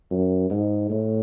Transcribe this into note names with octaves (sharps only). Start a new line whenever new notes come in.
F#2
G#2
A2